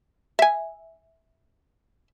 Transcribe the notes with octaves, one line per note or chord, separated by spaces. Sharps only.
E5 G#5